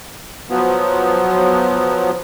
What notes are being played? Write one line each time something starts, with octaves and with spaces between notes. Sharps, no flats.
F3 F#3 B3